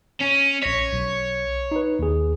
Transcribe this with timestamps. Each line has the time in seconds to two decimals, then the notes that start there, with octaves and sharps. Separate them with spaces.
0.20 C#4
0.62 A#1 C#5 A#6 B6
0.93 B1
1.71 D#4 B4
1.99 D#2 G#4